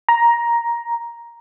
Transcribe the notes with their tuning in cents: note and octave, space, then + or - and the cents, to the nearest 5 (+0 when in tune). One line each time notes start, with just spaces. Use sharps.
A#5 +10